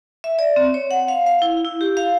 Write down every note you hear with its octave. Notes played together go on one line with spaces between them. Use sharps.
E5
D5
C4
C#5
F#5
F5
F5
E4
E4
G4
F5